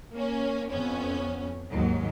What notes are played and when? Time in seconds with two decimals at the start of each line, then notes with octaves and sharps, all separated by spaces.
0.13 A#3 C#4
0.70 F2 B3 C#4
1.71 D#2 G#2 F#3